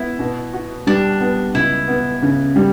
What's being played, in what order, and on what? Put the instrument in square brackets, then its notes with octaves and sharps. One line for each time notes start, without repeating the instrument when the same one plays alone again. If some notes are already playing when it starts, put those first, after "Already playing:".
Already playing: [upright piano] B3 [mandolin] E4
[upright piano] B2
F#4
[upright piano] G3 [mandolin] D4
[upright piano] B3
[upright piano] C#2 [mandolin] E4
[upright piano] B3
C#3
G3